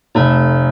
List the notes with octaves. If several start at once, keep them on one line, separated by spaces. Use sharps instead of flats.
F1 A3